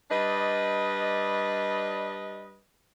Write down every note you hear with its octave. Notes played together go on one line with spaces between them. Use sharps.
G3 D4 B4 D#5